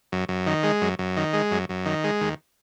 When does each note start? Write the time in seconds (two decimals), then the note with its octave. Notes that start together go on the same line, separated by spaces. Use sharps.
0.12 F#2
0.29 F#2
0.46 D#3
0.64 G#3
0.82 F#2
0.99 F#2
1.17 D#3
1.33 G#3
1.51 F#2
1.69 F#2
1.86 D#3
2.04 G#3
2.21 D#2